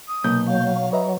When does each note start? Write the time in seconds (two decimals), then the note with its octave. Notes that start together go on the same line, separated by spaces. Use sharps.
0.08 D#6
0.24 B1 C3 A#3 G6
0.47 F#3 F5
0.93 B4 D#5 E5 A#5